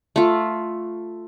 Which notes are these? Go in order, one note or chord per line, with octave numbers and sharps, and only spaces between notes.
A3 F4